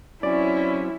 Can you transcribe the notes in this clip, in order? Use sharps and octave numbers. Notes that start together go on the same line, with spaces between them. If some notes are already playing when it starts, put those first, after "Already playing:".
F#3 C4 C#4 E4 D5